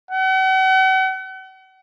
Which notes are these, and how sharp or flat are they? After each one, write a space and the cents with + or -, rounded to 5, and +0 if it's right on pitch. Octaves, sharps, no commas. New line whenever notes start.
F#5 +40